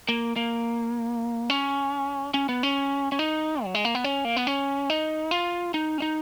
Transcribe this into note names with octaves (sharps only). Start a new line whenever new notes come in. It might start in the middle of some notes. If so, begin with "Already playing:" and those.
A#3
A#3
C#4
C#4
B3
C#4
C#4
D#4
F#3
G#3
A#3
B3
C#4
A#3
B3
C#4
D#4
F4
D#4
C#4
D#4